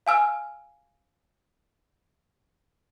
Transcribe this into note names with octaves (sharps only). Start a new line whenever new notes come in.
F5 G#5 E6 F6